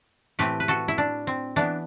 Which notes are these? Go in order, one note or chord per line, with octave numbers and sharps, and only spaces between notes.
A2 E3 A3 C4 G4 B4
B4
F#4 A4
E4
D4
C4
E3 B3 D4